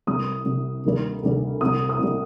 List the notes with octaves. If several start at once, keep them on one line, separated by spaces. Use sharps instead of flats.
C2 C3 G3 D#6
C2 C3 G3
D2 C3 D#3 G3 A#3
D2 C3 D#3 G3 A#3
C2 C3 G3 D#6
D#6
C2 C3 G3